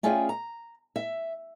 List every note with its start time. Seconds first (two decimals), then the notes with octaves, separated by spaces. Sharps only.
0.03 A3 C#4 F4 G#4 D5 G5
0.29 A#5
0.96 E5